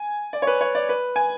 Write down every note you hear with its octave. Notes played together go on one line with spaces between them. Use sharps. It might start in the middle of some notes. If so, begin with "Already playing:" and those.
Already playing: G#5
D5
C#5
B4
C#5
D5
B4
G#5